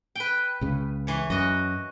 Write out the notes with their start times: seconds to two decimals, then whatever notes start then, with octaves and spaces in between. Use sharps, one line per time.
0.15 B4 G5
0.61 C#2 C#3
1.07 E3 C#5
1.30 F#2 F#4 D#5